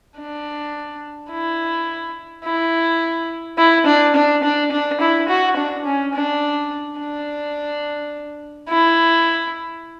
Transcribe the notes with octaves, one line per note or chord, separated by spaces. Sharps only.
D4
E4
E4
E4
D4
D4
D4
D4
E4
F#4
D4
C#4
D4
D4
E4